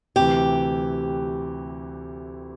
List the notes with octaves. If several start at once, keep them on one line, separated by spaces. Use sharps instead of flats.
D2 C3 E3 G4